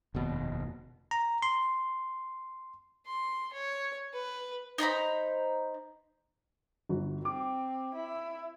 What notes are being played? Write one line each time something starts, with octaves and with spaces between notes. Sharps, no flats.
F1 D#2 B2
A#5
C6
C6
C#5
B4
D#4 C5 A#5 B5
G1 F#4
C4 D6
E4